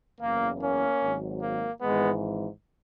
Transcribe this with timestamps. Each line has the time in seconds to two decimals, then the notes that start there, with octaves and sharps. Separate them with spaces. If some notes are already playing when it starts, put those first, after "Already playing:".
0.21 F#1 E2 C#3 A#3
0.61 A#3 C#4
1.02 G#1 G#2 F#3
1.42 A#3
1.82 G#1 G#2 E3 G#3 B3